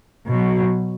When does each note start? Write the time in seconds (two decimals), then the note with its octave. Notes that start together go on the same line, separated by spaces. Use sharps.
0.27 B2 F#3